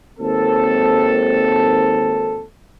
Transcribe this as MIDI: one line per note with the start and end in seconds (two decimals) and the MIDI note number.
0.19 2.44 32
0.19 2.44 39
0.19 2.44 60
0.19 2.44 69